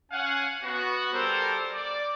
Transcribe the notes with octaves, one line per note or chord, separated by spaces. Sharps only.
C#4 F5 F#5 G#5
B3 F#4
G3 A4 A#4 C5
D5